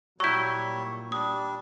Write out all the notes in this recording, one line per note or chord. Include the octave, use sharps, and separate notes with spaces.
A#2 F#3 G3 E4 C#5 C#6 G6
G3 D4 D#6